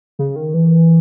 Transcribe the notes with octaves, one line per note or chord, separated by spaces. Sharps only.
C#3
D#3
E3